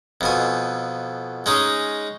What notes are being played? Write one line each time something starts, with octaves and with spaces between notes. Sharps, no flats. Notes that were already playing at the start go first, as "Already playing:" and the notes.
F2 B2 G#5
G#3 C#4 D#4